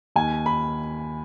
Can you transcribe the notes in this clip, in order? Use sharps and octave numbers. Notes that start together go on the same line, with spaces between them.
D#2 G#5
B5